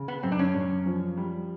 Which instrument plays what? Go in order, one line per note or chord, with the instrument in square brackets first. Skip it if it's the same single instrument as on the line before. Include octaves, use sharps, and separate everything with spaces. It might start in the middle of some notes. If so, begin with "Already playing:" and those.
Already playing: [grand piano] C#3
[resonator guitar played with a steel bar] B3
[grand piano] F#2 [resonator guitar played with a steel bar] C4
[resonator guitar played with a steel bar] D4
C#4
[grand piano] F#2
F3
G3